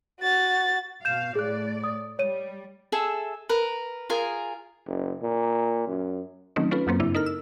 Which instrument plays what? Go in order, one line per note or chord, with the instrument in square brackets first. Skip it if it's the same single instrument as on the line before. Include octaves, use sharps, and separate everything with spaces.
[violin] F#4 A6
[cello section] B2 F5 [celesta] G6 E7
[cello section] A2 D5 [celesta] G#4 F#6
[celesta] D#6
[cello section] G3 [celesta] C#5 D#7
[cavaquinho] G#4 A4 E5
A#4 B4
F4 G#4 A#4 G#5
[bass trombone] F#1
A#2
F#2
[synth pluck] D#3 F#3 A3 C4 C#4 D#4
C#4 F4 A4 B4
F#2 F#3 A#3 C4
G2 C#3 C4 D4 E4
D#4 A4 A#4 F6
E6